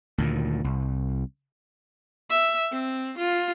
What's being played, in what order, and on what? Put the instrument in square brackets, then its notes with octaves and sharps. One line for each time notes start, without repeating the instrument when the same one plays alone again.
[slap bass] D2 A#2 D#3
C2
[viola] E5
C4
F4